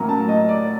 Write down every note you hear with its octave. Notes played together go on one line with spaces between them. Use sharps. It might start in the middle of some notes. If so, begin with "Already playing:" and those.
Already playing: A2 F#3 A#3 C#4 A#5
A5
D#5
D5